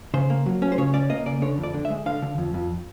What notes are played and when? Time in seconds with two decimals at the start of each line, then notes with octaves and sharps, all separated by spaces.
0.14 C#3 C5
0.30 A#3
0.46 F#3
0.62 C#4
0.72 C5
0.78 C#3 C#5
0.94 C#4 D5
1.10 A#3 D#5
1.26 C#3 D5
1.42 D3 C#5
1.58 F2
1.63 D5
1.74 D3
1.85 E5
1.90 G#3
2.06 D3 F5
2.22 D3
2.38 F2
2.54 F2